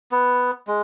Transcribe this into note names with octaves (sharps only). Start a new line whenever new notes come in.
B3
G#3